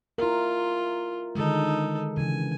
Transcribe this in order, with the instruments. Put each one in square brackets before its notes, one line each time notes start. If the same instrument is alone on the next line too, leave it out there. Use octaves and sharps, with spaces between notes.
[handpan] E4 A#4 [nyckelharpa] F4
[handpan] D3 D#3 G#3 [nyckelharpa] D#4 A4
[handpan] C#3 E3 [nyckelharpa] G#5